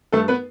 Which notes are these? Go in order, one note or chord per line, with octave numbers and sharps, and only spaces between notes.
G2 A3 A4
B3 B4